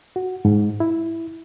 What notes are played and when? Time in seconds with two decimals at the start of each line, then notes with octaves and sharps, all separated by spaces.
0.16 F#4
0.45 G#2
0.80 E4